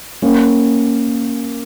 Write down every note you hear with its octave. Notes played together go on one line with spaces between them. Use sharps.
A#3 C#4